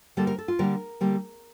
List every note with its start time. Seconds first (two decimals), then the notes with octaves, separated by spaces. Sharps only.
0.17 D3 G3 A#3 A4
0.27 A#4
0.38 A4
0.48 F4
0.59 D3 G3 A#3 A#4
1.01 D3 G3 A#3